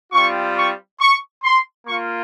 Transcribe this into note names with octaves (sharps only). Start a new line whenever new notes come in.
G3 C4 F4 C#6
C#6
C#6
C6
A#3 F4 C#6